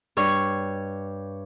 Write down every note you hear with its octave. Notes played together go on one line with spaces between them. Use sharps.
G2 C#5 C#6